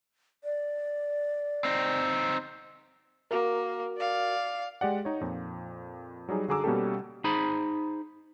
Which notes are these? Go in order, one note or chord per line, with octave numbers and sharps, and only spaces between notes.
D5
C4 D#4
A#3 F#4 A#4
D5 F5
G#3 G4 D5 F#5
D#4 C#5
F2 A#2
F#3 G3 D#4 G#4
D3 F#4 G#4 A#5 D6 E6
B2 G3 A#3 C#4 G4 A4
D#4 G#4 C5 B5